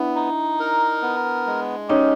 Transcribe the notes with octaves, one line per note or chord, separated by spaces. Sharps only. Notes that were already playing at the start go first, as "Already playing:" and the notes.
Already playing: B3 D4 E4
D#4
A#4
B3
G#3
C#4 D#4 G4